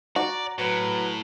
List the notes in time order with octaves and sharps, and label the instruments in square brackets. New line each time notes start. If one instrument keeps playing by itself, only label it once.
[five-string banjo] F#4 [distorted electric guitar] D5 [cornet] A#5
[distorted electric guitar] A2 [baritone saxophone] F#3 [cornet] B4